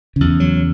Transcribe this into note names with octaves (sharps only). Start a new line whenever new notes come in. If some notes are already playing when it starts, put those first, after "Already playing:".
E2 C#3
F#3